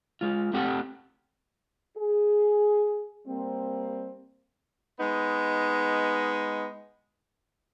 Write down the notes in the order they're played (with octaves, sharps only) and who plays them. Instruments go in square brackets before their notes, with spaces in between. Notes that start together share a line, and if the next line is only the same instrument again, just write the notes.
[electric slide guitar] G#3 F4
A3 C4 G4 F#5 G5
[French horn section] G#4
G3 A#3 C4
[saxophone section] G#3 B3 D#4